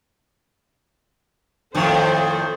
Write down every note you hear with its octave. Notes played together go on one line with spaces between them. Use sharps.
F2 A2 D#3 A4 C5